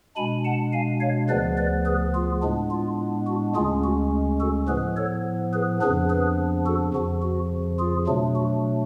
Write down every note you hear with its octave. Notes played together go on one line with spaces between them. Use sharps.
B2 G#3 D4 G#5 B5
F#5 A5
F5 G#5
C#5 F5
D2 C#3 F3 B3 B4 D5
B4 D5
G#4 B4
F4 G#4
A2 G#3 B3 D4
F4
F#4
D2 C#3 G#3 C#4 F4 G#4
F#4
F#4 A4
A2 F3 B3 G#4 B4
A4 C#5
G#4 B4
F2 C#3 F3 B3 D4 G#4 B4
G#4 B4
F#4 A4
F2 C#3 F3 F#4
F#4
F4 G#4
B2 F#3 A3 D4
F#4